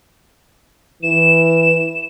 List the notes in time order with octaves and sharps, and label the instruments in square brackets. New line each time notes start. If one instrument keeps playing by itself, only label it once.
[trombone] E3 [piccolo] E7